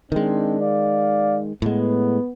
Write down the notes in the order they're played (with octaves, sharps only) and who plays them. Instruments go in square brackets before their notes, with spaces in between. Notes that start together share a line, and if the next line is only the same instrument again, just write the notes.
[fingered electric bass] D#3 G#3 [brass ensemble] C4 D4
[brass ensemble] D5 F5
[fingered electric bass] A2 G#3 [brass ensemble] B3